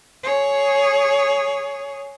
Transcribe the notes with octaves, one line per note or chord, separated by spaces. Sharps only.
G#4 C#5